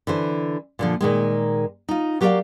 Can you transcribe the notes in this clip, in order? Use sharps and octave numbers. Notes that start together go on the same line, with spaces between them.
D3 E3 C5
A#2 D3 F3
A#2 D#3 G#3
D#4 F4
F#3 G4 A#4 C#5 D5 F5